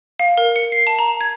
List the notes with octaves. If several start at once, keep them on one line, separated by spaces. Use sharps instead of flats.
F5
A#4
C#7
C7
A5
A#5
G#6